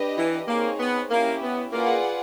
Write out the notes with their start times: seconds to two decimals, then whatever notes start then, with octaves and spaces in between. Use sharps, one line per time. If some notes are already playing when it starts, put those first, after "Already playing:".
Already playing: D4 G4 B4 D#5
0.17 E3
0.48 A#3 C4 D#4 G#4 C#5
0.80 B3
1.10 A#3 C#4 E4 G4
1.42 B3
1.72 A#3 F4 G#4 B4 D5 F#5